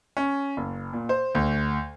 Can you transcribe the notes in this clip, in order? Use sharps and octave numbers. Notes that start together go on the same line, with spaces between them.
C#4
F#1
A#2
C5
D2